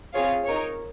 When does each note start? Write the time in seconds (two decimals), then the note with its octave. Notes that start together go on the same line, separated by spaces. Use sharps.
0.14 C4 F4 G#4 C#5 F5
0.45 D#4 A#4 C#5